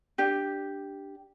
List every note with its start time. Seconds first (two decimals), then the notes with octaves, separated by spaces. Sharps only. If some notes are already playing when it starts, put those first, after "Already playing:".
0.18 D4 G4